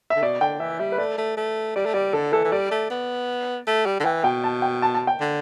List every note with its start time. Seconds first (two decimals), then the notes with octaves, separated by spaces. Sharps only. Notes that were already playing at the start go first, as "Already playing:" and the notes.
0.10 E5
0.16 D3
0.22 B2 D5
0.41 D3 G5
0.60 E3 E5
0.79 G3 E5
0.92 B4
0.98 A3 D5
1.18 A3
1.37 A3
1.76 G3 D5
1.86 A3
1.94 G3 D5
2.13 D3 A4
2.33 E3 A4
2.45 E3
2.52 G3 D5
2.71 A3
2.90 B3
3.67 A3
3.86 G3
4.00 D3
4.05 E3 G5
4.24 B2 G5
4.44 A5
4.62 G5
4.82 A5
4.94 A5
5.07 G5
5.20 D3